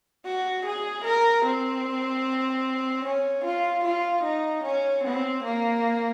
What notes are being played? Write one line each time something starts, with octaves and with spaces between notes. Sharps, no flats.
F#4
G#4
A#4
C4
C#4
F4
F4
D#4
C#4
C4
A#3